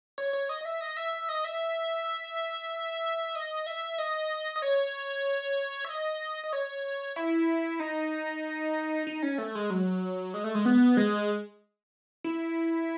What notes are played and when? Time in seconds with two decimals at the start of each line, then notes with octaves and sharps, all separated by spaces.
0.18 C#5
0.33 C#5
0.49 D#5
0.61 D#5
0.65 E5
0.81 D#5
0.97 E5
1.13 E5
1.29 D#5
1.45 E5
3.35 D#5
3.66 E5
3.98 D#5
4.56 D#5
4.62 C#5
5.85 E5
5.89 D#5
6.44 D#5
6.53 C#5
7.16 E4
7.80 D#4
9.07 D#4
9.23 C#4
9.38 A3
9.55 G#3
9.70 F#3
10.34 G#3
10.44 A3
10.55 G#3
10.65 B3
10.97 G#3
12.24 E4